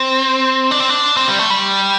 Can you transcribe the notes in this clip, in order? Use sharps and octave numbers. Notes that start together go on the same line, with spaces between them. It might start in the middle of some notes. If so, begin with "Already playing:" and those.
Already playing: C4
D4
C4
D4
C4
G3
A3
G3